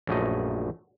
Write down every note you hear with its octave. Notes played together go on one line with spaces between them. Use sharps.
A#1 F#2 A3 D#5